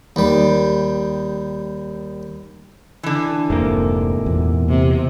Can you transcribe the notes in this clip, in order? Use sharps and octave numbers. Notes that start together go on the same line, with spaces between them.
D#2 G3
D3 E3
F1 G#2 C3 A#3
E2 A#2
C3